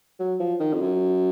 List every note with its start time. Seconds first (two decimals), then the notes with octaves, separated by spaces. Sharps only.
0.19 F#3
0.40 F3
0.60 D#3
0.74 F2
0.81 F#2